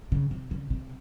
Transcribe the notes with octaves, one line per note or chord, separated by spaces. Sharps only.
C#3
C3
C#3
C3